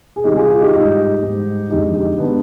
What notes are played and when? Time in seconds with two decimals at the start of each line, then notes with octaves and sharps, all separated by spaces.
0.16 G#4
0.24 C3 D#3 G3 D#4 G4
0.36 F4 G#4
0.49 F4 G#4
0.61 D#4 G4
0.73 G#2 G3 D#4 G4
1.22 G#2 G3
1.70 F2 D3 G#3 D#4 G4
1.95 D#4 G4
2.18 D3 G#3 B3 D4